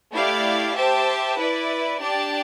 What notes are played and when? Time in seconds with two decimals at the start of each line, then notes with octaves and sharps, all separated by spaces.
0.12 A3 E4 G4 D5 F5
0.75 G4 C5 E5 A5
1.38 E4 B4 D5
2.01 D4 G4 D5 A5